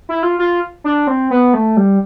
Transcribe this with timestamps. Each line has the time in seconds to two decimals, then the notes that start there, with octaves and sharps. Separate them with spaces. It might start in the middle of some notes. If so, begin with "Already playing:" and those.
0.09 E4
0.23 F4
0.39 F4
0.84 D4
1.07 C4
1.30 B3
1.54 A3
1.77 G3